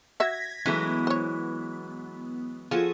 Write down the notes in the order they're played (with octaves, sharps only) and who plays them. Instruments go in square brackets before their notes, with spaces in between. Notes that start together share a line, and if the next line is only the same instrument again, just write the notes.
[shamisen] F#4 E5 [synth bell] G#6 A#6 B6
[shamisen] C#3 A3 [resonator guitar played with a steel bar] E3 F#3 G#3 [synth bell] B3 [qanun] E4
[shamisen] C5 C#5
[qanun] F3 F#4 A4 [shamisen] F4 [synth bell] G#4